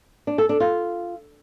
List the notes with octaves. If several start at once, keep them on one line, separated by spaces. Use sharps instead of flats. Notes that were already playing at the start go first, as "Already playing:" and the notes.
D4
A4
D4
F4